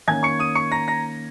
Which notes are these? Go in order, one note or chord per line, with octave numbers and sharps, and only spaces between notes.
D#3 A#3 C#4 G#5 G#6
C#6 C#7
D#6 D#7
C#6 C#7
A#5 A#6
A#5 A#6